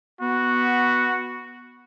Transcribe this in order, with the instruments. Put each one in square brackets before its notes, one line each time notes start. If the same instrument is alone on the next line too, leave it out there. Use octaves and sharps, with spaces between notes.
[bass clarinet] B3 [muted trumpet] F#4